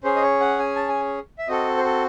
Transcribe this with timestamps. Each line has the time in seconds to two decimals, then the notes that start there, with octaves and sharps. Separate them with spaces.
0.04 C#4 G#4 C5
0.16 D#5
0.22 C#5
0.40 F#5
0.59 G#5
0.76 A5
0.88 G#5
1.39 E5
1.48 C4 F#4 A4 D#5
1.77 C5
1.84 A4